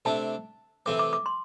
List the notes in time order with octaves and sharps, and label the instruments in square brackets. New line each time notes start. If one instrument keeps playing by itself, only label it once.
[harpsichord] C3 A3 D4 [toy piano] A5
[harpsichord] C3 E3 A3 C4 [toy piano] D6
[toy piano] D6
D6
C6